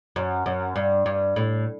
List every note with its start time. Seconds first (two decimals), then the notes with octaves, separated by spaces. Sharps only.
0.16 F#2
0.46 F#2
0.76 G2
1.06 G2
1.36 A2